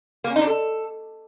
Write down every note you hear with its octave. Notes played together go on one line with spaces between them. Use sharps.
A#3
C#4
D#4
D4
A4